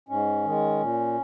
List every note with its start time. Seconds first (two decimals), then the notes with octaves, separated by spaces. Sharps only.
0.09 G#2 C#4
0.45 D#3 G#3
0.81 A#2